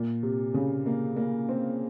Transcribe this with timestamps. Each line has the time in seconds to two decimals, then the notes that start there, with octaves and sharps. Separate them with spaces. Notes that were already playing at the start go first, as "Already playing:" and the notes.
Already playing: A#2
0.23 C3
0.54 C#3
0.86 A#3
1.16 A#3
1.49 C4